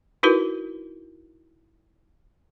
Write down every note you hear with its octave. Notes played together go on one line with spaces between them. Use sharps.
D#4 E4 F#4 A#4 B4